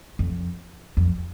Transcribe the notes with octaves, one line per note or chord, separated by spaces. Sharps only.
F2
F2